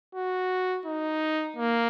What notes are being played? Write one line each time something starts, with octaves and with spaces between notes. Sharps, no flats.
F#4
D#4
A#3